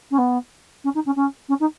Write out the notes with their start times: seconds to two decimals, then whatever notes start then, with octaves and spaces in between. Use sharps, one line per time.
0.10 C#4
0.18 B3
0.84 C#4
0.94 D#4
1.05 C#4
1.16 C#4
1.48 C#4
1.59 D#4